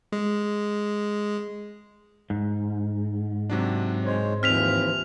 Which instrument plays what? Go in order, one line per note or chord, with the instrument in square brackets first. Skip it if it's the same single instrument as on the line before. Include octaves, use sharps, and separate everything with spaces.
[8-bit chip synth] G#3
[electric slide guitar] G#2
[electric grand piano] C3 F#3 D4
[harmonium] G#3 C5 C#5
[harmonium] D#2 E3 F3 [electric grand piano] C4 [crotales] F6 B6 F7